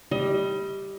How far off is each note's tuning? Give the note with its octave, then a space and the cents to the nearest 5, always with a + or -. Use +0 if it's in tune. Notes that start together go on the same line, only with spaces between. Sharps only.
G3 +0 D#5 +30